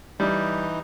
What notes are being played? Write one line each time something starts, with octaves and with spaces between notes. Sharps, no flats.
E3 G3 D#4